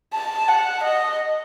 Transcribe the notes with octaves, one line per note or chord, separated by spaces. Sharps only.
A5
F#5
D#5